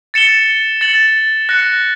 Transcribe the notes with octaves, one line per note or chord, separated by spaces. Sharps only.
A6 C#7 E7 G7
A6 C#7 F#7
F#6 A#6 C#7